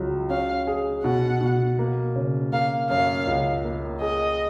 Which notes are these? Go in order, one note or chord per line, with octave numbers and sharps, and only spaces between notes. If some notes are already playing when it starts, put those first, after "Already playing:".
Already playing: C#2 F#3
C#4 F5
G#4
B2 F#5
B2
A#3
C#3
A#3 F5
F#2 F5
C#2
A#3
G#4 D#5